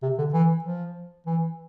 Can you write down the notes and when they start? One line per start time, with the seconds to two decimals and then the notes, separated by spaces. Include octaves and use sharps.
0.02 C3
0.18 D3
0.33 E3
0.64 F3
1.26 E3